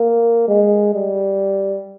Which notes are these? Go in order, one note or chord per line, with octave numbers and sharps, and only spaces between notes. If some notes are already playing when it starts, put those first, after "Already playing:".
Already playing: A#3
G#3
G3